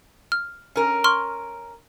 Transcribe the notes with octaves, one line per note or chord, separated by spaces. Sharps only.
F6
C#4 A#4
C6 C#6 F6